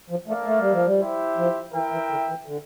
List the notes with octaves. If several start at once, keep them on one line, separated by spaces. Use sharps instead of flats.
F3
A3 A#3 D4 A4 D5 F5
A3
G3
F3
G3
E4 G4 C5 E5
F3
E3 E4 A#4 E5 G5
E3
D3
E3
D3